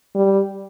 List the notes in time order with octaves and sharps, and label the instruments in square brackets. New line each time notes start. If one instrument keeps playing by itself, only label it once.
[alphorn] G3